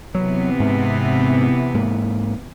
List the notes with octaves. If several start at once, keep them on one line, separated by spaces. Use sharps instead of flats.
C3 E3 F#3 B3
G#2
G#2 A#3